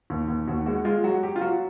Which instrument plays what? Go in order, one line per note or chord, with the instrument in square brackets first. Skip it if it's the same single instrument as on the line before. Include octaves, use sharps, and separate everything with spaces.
[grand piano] D#2
D#2
D#2 F#4
G#3 F#4
G#3 F4
F#3 F#4
F#3 G4
F4
F#3 F#4